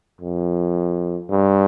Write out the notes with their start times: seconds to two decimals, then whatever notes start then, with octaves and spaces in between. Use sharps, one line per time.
0.21 F2
1.29 G2